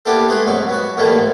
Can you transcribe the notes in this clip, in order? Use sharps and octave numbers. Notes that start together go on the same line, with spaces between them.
A#3 B3 D4 E4 G4 A4
G#3 A3 G#4 B4
C2 G#2 F#3 C#6
B3 F#4
A2 D#3 E3 G3 A3 A#3
G#2